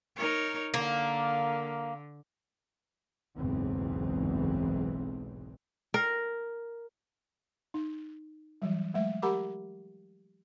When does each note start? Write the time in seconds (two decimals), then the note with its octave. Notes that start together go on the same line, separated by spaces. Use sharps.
0.16 D#4 A#4 C#5
0.74 D3 A#3
3.37 F#1 B1 E2 G#2 E3 C4
5.94 A#4
7.74 D#4
8.62 E3 F#3 G3
8.94 F#3 G#3 A3 E5
9.22 G4 A#4 F#5 A#5 B5 D6